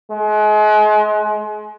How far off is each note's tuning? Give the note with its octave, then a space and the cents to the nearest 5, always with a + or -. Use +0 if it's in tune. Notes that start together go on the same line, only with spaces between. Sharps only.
G#3 +35